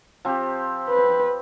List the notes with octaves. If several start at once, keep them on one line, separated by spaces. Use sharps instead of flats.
F3 C4 G4
B4